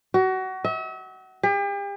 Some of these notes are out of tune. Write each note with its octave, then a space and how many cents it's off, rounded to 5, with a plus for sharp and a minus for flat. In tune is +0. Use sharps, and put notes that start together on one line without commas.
F#4 +25
E5 -40
G4 +40